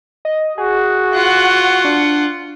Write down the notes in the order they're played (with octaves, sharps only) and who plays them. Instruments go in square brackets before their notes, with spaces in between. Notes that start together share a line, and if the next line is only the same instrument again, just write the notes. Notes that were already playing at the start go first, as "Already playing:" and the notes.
[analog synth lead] D#5
[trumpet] F#4 [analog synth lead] G#4
[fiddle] F4 F#5
[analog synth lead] D4